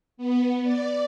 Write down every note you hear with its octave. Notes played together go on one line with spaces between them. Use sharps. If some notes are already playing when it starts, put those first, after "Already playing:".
B3
D5